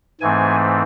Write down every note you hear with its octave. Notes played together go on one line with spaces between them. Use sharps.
G#2 E3 A3 C4 G#5